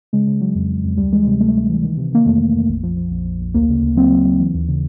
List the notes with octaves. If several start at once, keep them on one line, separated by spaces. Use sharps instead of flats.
C#3 G#3
C#3
F#3
F2
F2
F2
D2 G3
E3 G#3
C3 G3
D2 A3
D2
E3
D#3
C3
D#3 A#3
F2 A3
F2
F2
A#1
F3
F3
A#1
A#1
A#1
D2 A#3
C#3
D2
F#3 C4
F#3
F#3
E3
D#2
C#3